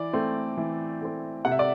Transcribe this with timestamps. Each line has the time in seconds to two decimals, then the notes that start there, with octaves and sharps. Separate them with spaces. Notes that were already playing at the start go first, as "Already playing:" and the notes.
Already playing: E3 D5
0.13 A3 C4
0.57 E3
1.01 A3 C4
1.45 C3 F#5
1.51 E5
1.59 D5